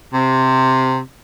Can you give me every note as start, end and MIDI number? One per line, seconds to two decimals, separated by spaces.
0.13 0.98 48